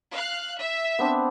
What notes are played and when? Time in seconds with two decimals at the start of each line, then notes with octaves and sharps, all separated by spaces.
0.14 F5 F#6
0.60 E5
0.99 B3 C4 D4